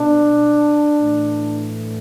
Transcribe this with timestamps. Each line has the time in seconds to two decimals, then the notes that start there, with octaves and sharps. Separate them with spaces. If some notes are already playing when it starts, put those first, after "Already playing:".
Already playing: B2 D4
0.95 A2 E3